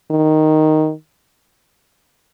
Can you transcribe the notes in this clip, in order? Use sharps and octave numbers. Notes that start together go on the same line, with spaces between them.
D#3